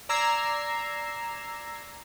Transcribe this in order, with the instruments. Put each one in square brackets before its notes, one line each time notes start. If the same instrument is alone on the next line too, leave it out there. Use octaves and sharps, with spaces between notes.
[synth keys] D5 A#5 E6 G#6 C7